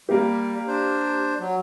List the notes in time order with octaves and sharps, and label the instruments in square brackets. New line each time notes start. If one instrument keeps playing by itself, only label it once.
[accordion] G3 [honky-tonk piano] A#3 G4
[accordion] D4 C5
F#3